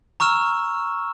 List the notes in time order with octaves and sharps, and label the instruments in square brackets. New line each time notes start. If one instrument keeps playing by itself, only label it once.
[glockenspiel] A#5 C#6 E6 F6 E7